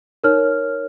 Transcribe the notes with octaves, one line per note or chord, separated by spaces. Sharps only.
D#4 A#4 C#5 F6